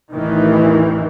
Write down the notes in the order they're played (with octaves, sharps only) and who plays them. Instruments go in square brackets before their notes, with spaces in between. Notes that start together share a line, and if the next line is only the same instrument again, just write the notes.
[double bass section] A1 E2 D#3 E3